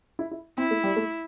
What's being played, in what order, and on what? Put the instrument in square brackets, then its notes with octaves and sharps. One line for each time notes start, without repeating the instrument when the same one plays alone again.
[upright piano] E4
E4
[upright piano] C4 [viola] E4
[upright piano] A3
G3
A3